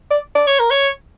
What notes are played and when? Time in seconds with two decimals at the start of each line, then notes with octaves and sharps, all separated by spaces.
0.11 D5
0.35 D5
0.47 C#5
0.60 A#4
0.71 C#5